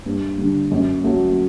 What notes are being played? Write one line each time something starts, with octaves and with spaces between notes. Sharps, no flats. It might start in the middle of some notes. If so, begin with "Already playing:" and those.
G2
D3 G3
F#2
F#3 A3